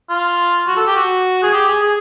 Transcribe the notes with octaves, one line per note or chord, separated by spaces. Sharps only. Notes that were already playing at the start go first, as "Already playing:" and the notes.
F4
F#4
A4
G4
F#4
G#4
G4
G#4
G#4